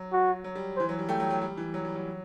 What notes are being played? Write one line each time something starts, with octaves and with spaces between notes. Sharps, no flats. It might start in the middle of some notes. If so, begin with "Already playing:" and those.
Already playing: F#3
F#4
F#3
G3
E3 C5
F#3
G3
A3 G5
F#3
F#3
G3
E3
F#3
G3
F#3